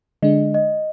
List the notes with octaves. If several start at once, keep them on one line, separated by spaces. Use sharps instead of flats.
D3 G#3 D4 D#5
D#5